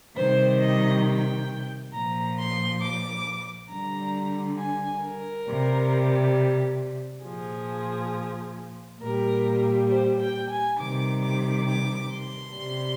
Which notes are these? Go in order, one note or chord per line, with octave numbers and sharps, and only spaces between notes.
C3 D#3 G3 C5
D#5
G5
A#2 F3 A#5
C6
D6
D3 G3 A#5
G#5
A#4
C3 G3
A#2 F3 G#4
A#2 G3 A#4
C5
G5
G#5
C3 D#3 G3 D6
D6
D6
C6
C3 G3